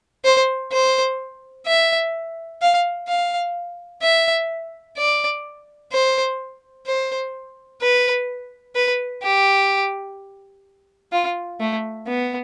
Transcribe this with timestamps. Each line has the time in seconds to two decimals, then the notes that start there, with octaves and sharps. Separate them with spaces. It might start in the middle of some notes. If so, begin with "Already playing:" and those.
0.25 C5
0.72 C5
1.66 E5
2.62 F5
3.08 F5
4.03 E5
4.98 D5
5.92 C5
6.86 C5
7.82 B4
8.75 B4
9.23 G4
11.12 F4
11.60 A3
12.07 B3